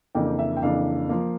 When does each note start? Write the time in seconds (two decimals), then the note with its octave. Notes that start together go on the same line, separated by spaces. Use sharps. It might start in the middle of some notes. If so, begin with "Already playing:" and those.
0.15 F2 C#3 E3 A#3 D4 G5
0.39 E5
0.57 G5
0.62 F2 C#3 E3 A#3 D4 F5
1.09 F3 A#3